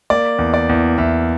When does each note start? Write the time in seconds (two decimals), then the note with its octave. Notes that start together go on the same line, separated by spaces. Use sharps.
0.10 A#3 D5
0.38 E2
0.54 D5
0.69 E2
0.98 E2 E5